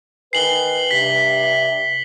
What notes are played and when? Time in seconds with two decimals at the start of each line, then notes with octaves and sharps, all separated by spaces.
0.33 D#3 G#4 B4 C7 F#7 G7
0.91 G2 C3 B6